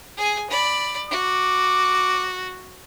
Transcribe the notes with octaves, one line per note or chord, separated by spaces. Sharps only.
G#4 G#5
D5 B5
F#4 D6